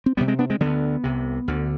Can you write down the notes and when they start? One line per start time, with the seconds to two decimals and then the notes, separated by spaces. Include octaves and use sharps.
0.06 C4
0.17 D2 G3 B3
0.20 C3
0.28 G#3 C4
0.39 B3 D4
0.50 G#3 C4
0.61 D3 G3 B3
0.65 D2
1.04 C2 C3
1.48 D2 D3